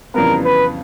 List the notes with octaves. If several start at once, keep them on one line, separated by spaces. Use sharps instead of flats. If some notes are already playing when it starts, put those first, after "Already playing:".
F2 C#3 E3 G3 B3 A#4
B4